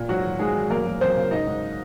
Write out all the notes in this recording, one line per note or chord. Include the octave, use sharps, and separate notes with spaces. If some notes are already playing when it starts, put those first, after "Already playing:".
Already playing: A#2
G#2 F#3 F#4
D#3
G#2 G#3 G#4
D#3
F#2 A#3 A#4
F#2
F#2 C4 C5
C#3
G#2 D#4 D#5
G#2